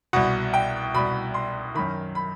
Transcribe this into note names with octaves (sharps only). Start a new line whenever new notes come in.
C2 B2 F#5
G5
C2 B2 B5
C6
F#2 D#3 B5
B5